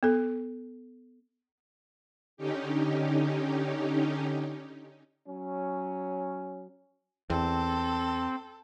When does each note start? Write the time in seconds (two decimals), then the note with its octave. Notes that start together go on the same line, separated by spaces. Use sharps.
0.03 B3 A4
2.37 D3 C#4 D#4 G4
5.27 F#3 C#4
7.30 E2 C4 A4